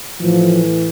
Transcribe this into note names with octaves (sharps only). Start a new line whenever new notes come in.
A2 E3 F3